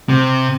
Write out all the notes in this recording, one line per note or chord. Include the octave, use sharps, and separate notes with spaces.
C3